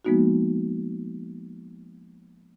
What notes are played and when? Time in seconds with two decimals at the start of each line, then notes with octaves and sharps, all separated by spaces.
0.05 F3 G#3 A#3 B3 D#4 F#4